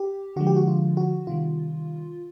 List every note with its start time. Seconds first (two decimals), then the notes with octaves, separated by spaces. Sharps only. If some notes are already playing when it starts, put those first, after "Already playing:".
Already playing: G4
0.36 D3 F3 G#3 F#4
0.47 G4
0.56 F#4
0.67 F4
0.97 F#4
1.27 C3 D#3 G3 F4